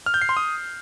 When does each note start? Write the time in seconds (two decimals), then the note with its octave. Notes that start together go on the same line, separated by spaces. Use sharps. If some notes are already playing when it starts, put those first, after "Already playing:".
0.06 F6
0.14 G6
0.22 C7
0.29 C6
0.37 D#6